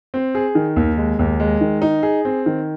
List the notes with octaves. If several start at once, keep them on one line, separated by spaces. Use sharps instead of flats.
C4
G#4
D#3
D#2
G#3
D#2
G#3
D#3
D#4
G#4
C4
D#3